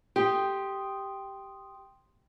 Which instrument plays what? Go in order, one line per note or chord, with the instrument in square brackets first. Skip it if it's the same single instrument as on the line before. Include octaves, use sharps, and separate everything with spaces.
[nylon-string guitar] G4 [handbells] G5 C6 D#6